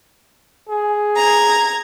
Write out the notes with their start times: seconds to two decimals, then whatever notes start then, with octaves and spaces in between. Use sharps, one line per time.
0.69 G#4
1.17 A#5 G#6